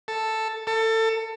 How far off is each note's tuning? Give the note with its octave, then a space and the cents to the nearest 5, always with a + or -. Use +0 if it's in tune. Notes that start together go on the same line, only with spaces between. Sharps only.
A4 +5
A4 +25